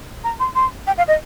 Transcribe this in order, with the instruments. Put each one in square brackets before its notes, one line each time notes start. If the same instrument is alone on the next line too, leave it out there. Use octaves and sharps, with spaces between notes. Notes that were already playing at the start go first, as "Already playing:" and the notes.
[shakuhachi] A#5
C6
C6
G5
F5
D#5